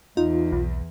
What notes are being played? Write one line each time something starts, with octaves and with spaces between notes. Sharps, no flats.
E2 D#4 F4
B1